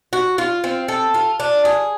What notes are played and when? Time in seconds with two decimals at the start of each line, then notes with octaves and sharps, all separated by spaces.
0.13 F#4
0.38 F4
0.64 C4
0.88 A4
1.14 F4
1.40 D4
1.65 G#4